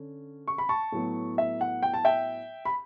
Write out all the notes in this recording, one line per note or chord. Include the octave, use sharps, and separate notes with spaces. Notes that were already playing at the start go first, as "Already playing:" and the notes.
Already playing: D3 C#4
C#6
B5
A5 C#6
A2 F#3 B3
E5
F#5
G5
A5
E5 G5
B5